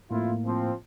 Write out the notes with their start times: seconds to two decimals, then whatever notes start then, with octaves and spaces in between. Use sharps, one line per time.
0.11 F2 A2 A#3 E4 F4
0.45 F3 C4